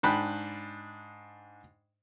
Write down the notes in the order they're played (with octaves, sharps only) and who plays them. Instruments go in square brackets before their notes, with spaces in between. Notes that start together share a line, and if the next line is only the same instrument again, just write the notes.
[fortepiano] G#2 D4 G5 B5 F#6